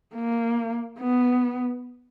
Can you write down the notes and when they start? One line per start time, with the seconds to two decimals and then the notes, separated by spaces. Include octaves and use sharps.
0.15 A#3
0.99 B3